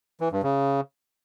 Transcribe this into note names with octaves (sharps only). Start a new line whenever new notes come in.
E3
G2
C#3